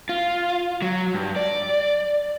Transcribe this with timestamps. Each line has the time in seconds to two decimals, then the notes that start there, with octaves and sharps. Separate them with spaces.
0.09 F4
0.82 F#3
1.14 G2
1.36 D5